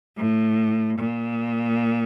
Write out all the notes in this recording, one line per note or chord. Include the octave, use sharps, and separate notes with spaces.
A2
A#2